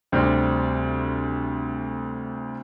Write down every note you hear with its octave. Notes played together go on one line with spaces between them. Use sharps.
D2 C3 G3 C4